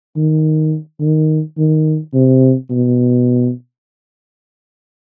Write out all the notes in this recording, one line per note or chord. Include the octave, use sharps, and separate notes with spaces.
D#3
D#3
D#3
C3
B2